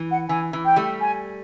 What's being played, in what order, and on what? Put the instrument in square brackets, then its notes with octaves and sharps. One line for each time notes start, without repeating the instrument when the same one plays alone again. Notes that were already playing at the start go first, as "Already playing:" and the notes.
Already playing: [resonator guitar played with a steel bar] E3
[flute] F#5
[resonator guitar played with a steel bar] E3 [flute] G#5
[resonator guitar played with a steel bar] E3
[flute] G5
[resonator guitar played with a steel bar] G3 A3
[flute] G#5